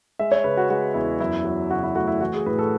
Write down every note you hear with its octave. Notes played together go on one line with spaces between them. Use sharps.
G#3 E5
C#5
C#3 B4
F#4
G#3 F#4
E2 E4
F#2 E4
F#3
C#3 F#4
E4
A3 F#4
E4
E3 F#4
G#4
A2 B4
A4